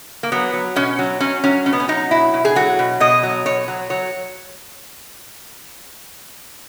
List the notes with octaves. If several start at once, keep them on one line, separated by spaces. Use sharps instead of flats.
A#3
F#3 B3
F#3
B2 C#4
F#3
F#3 C#4
F#3 C#4
B2 C#4
B3
C#4
F#3 D#4
B2 E4
B2
G#4
F#3 F#4
B2
B2 D#5
F#3
B2 C#5
F#3
F#3 C#5